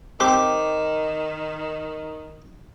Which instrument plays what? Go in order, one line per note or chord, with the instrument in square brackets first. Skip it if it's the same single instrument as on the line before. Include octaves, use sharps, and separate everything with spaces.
[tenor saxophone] D#3 [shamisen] C4 G4 C5 [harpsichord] D6